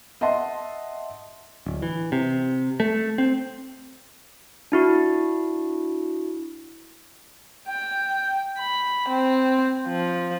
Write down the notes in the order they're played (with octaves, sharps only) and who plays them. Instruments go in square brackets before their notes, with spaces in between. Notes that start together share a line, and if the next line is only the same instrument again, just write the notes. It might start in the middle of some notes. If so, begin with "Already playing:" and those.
[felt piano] D#5 E5 F#5 A5 C6
[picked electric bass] D1
E3
C3
A3
C4
[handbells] D4 E4 F#4
[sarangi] G5
B5
C4
F3